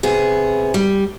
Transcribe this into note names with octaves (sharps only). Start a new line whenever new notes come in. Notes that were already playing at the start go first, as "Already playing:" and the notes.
C3 B3 G#4
G3